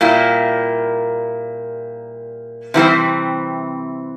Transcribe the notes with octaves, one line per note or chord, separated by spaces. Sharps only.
A#2 G3 A#3 E4
C3 E3 G3 C4